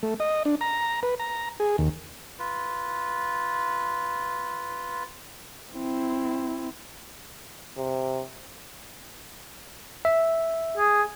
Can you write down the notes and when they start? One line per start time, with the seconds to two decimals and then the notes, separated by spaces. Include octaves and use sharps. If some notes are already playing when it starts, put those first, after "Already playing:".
0.03 A3
0.20 D#5
0.45 D4
0.61 A#5
1.03 B4
1.20 A#5
1.60 G#4
1.78 D#2
2.39 F4 B4
5.73 C4 E4
7.77 C3
10.05 E5
10.77 G#4